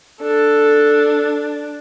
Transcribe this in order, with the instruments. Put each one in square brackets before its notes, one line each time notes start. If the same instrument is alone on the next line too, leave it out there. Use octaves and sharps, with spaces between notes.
[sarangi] D4 [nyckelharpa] A4